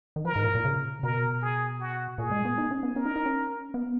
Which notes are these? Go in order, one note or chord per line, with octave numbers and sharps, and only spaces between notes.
D#3
F3 A#4
G#2
A#2
A#2
C#3
B2 A#4
G#4
F#4
A#2 G#4
G#3
B3
D#4
C#4
B3
C#4 A#4
D#4
D#4
C#4
B3